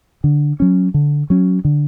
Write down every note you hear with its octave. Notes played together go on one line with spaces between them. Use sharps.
D3
F#3 C#4
D3
F#3 C#4
D3